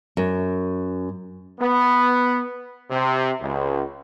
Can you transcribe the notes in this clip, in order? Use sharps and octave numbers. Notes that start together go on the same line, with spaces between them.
F#2
B3
C3
C#2